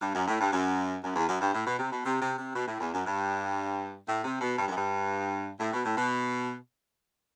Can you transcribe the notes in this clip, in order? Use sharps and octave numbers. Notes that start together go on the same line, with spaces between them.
G2
F#2
A2
G2
F#2
F#2
E2
F#2
G2
A2
B2
C3
B2
C3
C3
C3
B2
A2
E2
F#2
G2
A2
C3
B2
G2
F#2
G2
A2
B2
A2
B2